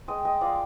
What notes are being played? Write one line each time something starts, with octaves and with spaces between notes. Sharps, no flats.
G#3 D#5 G5
D#5 G5
F3 D5 F5